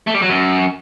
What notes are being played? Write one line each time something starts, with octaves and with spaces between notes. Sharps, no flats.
A3
G3
F#3
F#2